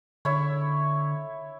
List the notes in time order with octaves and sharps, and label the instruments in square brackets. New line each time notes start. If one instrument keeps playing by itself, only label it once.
[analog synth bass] D3 [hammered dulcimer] E4 C#5